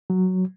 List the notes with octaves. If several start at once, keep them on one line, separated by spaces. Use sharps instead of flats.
F#3